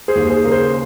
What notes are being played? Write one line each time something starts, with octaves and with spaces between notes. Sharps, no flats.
G#4 C5
D#2
G#4 C5
C#3 A#4
G#4 C5